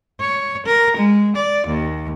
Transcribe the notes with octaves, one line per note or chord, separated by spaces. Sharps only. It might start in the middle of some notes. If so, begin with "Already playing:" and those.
C#5
A#4
G#3
D5
D#2